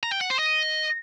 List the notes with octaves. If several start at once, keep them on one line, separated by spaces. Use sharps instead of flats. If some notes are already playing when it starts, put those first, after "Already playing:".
A#5
G5
F#5
C5
D#5